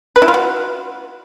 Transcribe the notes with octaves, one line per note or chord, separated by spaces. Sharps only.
B4
E4
F4
F#4